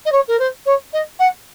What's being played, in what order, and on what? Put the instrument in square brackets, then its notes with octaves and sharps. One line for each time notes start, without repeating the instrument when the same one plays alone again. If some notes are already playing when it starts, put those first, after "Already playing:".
[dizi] D#5
C#5
A#4
C5
C#5
D#5
F#5